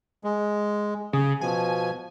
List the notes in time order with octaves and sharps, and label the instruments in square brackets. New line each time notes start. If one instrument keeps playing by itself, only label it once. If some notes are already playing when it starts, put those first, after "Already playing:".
[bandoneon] G#3
[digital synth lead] C#3 [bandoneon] G#4
[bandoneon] B2 F3 [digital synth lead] G#5